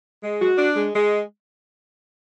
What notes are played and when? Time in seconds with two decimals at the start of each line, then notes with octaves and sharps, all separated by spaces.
0.22 G#3
0.40 F#4
0.58 D4
0.76 G#3
0.94 G#3